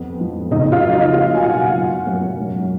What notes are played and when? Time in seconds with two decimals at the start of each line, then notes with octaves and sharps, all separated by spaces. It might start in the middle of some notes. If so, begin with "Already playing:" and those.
Already playing: F2 B3
0.21 F3
0.51 C#3 D#4 D#5
0.72 F4 F5
0.82 F#3
0.92 D#4 D#5
1.13 A#3 F4 F5
1.35 G#5
1.44 B2 F#4 F#5
1.76 F#2
2.06 F#2
2.38 G#2